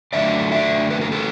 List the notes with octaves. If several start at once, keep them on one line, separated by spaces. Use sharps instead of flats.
F#2 D3 F#3 A3 D5 E5
D5 E5
B4
A#4
A4 B4